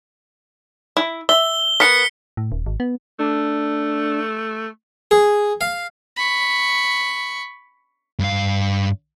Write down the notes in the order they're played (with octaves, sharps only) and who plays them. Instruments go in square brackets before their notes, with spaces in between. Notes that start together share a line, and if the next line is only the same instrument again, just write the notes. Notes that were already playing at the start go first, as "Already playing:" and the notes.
[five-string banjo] E4
[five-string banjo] E5 [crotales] G7
[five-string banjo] B3 A#4 [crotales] B6 C#7
[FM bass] A2
D#1
G#1
B3
[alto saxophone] A3 [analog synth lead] D4
[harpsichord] G#4
F5
[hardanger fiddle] B5 C#6
[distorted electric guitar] G2 F5